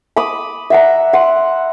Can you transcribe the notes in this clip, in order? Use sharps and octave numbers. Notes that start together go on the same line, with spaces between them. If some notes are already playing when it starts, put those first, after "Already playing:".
B5 D6 D#6
E5 F#5 A#5
F#5 C6